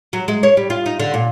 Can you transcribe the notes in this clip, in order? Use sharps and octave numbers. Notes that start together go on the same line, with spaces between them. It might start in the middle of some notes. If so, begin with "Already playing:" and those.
F#3
G#3
C#5
G3
F4
D#4
D3
A#2